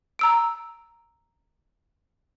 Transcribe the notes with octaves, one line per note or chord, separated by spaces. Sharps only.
A#5 E6 D7